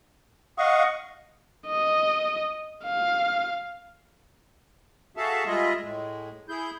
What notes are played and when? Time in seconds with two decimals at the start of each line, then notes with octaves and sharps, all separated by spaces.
0.58 D#5 F5 F#5 C#6
1.67 D#5
2.84 F5
5.17 F#4 G#4 A4 E5 F5 A5
5.46 G3 G#3 F4 G#4 D#5 E5
5.82 A2 G#3
6.49 E4 G#4 G6